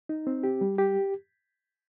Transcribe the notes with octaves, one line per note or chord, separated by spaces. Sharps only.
D#4
C4
G4
G3
G4